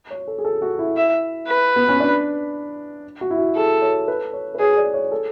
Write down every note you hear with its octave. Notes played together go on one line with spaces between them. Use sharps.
C#5
A4
G#4
A4
F#4
E4
E5
B4
B3
C#4
D4
F#4
E4
F#4
G#4 A4
C#5
B4
C#5
B4
G#4 C#5
D5
C#5
A4